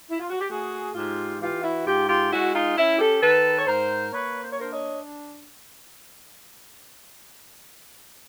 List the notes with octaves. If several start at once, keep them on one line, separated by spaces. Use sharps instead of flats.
E4
F4
F#4
G4
A3 F#4 G#4
G#2 F4 G4
E3 F4 G4
E4 F#4
G#2 F4 G4
F4 G4
G#3 E4 F#4
D#4 F4
C#4 E4
G4 A4
D#3 A4 B4
C#5
G#2 A#4 C5
A#3 B4 C#5
C5
C#5
D4 A#4 C5
C#5 D#5